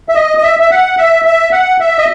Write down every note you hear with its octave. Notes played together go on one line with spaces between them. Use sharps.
E5
D#5
D#5
E5
E5
F#5
E5
E5
F#5
E5
D#5